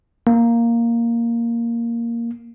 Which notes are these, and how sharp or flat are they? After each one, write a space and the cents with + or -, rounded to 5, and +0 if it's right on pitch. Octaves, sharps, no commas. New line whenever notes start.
A#3 +0